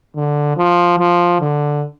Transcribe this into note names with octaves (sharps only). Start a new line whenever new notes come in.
D3
F3
F3
D3